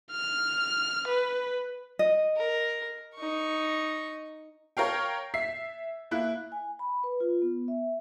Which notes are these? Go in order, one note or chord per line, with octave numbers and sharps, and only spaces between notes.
F6
B4
D#5
A#4
D#4 C#6
A#4 C#5 F5 G5
E5 B6 C7
A#3 E4 F#6
G#5
B5
B4
F4
B3
E5